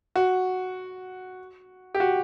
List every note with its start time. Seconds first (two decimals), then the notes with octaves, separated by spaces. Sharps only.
0.16 F#4
1.95 G4
2.00 F#4